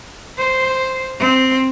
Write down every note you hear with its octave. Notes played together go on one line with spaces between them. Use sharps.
C5
C4